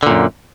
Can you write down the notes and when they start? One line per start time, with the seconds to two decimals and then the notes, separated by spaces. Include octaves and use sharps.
0.03 D3
0.07 A#2
0.10 F#2